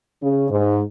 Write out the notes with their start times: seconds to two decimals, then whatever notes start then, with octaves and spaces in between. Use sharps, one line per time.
0.22 C#3
0.51 G#2